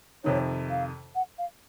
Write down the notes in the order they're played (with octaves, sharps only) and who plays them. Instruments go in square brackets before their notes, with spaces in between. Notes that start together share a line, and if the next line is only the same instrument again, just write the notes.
[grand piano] F2 C3 D#3 [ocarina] C#5
[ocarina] F5
F#5
F5